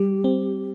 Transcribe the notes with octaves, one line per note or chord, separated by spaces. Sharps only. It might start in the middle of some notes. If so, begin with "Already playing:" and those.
Already playing: G3 G4
C4